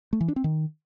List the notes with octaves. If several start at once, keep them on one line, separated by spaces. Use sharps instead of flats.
A3
E3
D4
C4
D#3